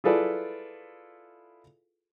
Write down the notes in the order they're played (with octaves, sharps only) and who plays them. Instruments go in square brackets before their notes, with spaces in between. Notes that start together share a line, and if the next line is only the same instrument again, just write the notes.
[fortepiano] E4 F4 G#4 A4 B4 D5